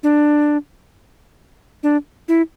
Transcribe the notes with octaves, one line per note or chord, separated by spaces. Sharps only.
D4
D4
E4